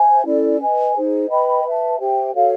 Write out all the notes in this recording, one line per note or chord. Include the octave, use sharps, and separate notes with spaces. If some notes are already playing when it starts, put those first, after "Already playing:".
Already playing: C5 E5 G#5
C#4 E4 A4 D5
B4 D#5 G#5
D#4 G#4 C5
B4 D#5 G5 B5
B4 E5 A5
G4 C5 E5 G5
F#4 A4 C#5 F5